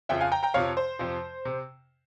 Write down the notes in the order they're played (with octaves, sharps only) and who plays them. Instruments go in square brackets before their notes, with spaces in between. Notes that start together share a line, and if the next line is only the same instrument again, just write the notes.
[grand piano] F2 C#3 F3 E5 G5
F5 G#5
G5 A#5
G5 A#5
F2 C3 F3 C#5 F5
C5
F2 C3 F3
C3